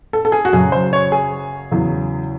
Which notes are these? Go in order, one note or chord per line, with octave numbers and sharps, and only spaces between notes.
A4
A4
G#4
F#4
F#2 C#3 F#3 G#4
C5
C#5
G#4
E2 C#3 F#3